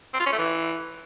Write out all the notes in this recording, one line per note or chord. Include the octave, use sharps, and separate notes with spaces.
C4
F4
C#4
A3
E3